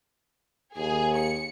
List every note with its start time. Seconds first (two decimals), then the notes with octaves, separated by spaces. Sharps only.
0.76 D#2 G#4
1.17 C#7